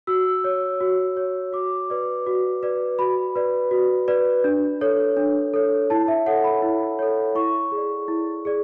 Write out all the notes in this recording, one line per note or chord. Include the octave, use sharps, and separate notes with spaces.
F#4 E6
C#5
F#4
C#5
F#4 D6
B4 D5
F#4
B4 D5
F#4 B5
B4 D5
F#4
B4 D5
D4
A4 C#5
D4
A4 C#5
E4 A5
E5
A4 C#5 F#5
B5
E4
A4 C#5
E4 C#6
G#4
D5
E4
G#4 D5